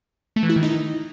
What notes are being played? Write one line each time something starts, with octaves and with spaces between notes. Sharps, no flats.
A3
E3
E4
D#3
D#4